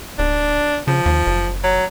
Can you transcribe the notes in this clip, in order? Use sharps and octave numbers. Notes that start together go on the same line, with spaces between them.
D1 D4
C#3 F3
D#2
F#1
F#3